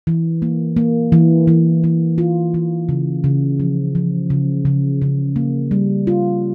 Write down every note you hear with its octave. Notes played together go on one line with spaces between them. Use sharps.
E3
A#3
A#3
E3
E3
E3
F4
E3
C#3
C#3
F3
F3
C#3
C#3
C#3
A#3
G3
F4